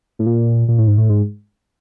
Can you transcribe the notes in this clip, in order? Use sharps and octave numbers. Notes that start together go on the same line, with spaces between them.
A2
A#2
A#2
A2
G#2
A2
G#2